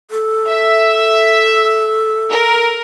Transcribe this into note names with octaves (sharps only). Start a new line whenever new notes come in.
A4
E5
A#4